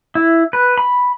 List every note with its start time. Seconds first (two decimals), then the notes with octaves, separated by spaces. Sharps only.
0.15 E4
0.53 B4
0.78 B5